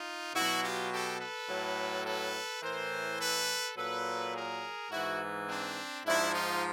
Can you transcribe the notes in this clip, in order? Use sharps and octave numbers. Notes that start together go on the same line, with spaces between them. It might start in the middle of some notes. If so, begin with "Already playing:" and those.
Already playing: D#4 F4
B2 F#3 E4 F#4
F4 G4
G4 A4
A4 B4
A2 F#3
A4 B4
A2 E3 A#4 C5
A4 B4
A#2 F#3 A4 B4
G#4 A#4
G#2 E3 E4 F#4
C4 D4
G#2 F3 D4 E4
D#4 F4